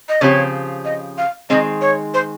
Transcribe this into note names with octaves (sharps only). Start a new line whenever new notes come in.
D#5
C#3 F3 C4 G4 C#5
D#5
F5
D#3 G#3 C4 D#5
C#5
C5